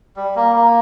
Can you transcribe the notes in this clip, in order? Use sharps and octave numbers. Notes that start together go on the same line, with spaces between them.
G3
A#3
A#3